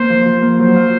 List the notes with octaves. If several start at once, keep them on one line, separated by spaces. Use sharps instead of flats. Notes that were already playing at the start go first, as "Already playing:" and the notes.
Already playing: A#3 C5
F3
F3
A#3
F#3 C5
F4